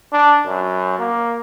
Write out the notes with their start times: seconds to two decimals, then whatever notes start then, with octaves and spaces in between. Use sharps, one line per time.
0.13 D4
0.46 F#2
0.99 A#3